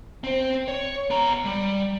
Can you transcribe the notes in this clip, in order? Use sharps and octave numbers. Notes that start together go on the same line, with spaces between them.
C4 C5
C#5
B3 A#5
G3